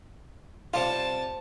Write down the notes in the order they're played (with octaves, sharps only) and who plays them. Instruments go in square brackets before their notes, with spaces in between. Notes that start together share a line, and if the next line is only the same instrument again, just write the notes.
[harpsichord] C3 G3 G4 [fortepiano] F4 [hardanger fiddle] A5